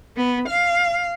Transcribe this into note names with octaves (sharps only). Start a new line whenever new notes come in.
B3
F5